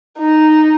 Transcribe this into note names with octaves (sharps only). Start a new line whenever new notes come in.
D#4